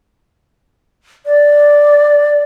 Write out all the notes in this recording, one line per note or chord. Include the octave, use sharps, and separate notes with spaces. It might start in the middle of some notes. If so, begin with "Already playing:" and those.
D5